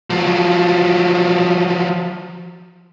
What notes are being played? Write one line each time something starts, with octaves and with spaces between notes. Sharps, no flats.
F3 F#3